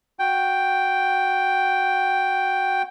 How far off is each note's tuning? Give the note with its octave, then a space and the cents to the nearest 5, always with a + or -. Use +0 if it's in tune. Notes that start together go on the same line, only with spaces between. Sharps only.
F#4 -10 G5 +0